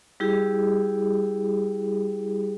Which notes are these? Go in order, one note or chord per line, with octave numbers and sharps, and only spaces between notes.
G3 E4 G4 G#4